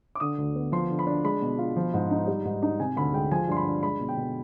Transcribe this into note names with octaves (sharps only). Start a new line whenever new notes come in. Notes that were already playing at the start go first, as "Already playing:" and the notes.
D6
D3 D#6
D2
B3
F3 C6
D3
B5
D4
G#3 B5
B2
F4
F3
G#2
D#4
G3
G#2
D#4
C3 G#5
D2 B5
G#3 G5
F3 G#5
G2 C6
B5
D4
G#3 B5
B2
G5
B2